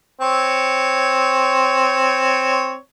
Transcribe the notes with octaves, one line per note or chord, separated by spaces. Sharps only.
C4 C#5